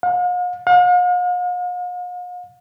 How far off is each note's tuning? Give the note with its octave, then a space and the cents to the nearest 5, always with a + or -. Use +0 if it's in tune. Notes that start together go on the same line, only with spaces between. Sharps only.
F5 +45
F5 +45